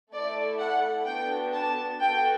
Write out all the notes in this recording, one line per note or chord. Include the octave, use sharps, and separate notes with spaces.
A3 E4 A4 D5
F#5
B3 D4 F#4 A4 G5
A5
B3 F#4 A4 G5